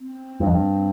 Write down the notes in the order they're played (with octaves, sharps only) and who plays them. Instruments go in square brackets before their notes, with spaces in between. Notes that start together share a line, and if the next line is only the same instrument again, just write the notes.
[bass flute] C4
[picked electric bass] G2
F2
G2